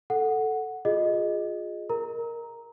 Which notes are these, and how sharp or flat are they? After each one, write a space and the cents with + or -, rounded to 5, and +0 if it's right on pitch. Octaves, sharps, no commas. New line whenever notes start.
A4 +0 F#5 +0
F4 +25 G#4 +0 D#5 -5
A#4 +0 A#5 +0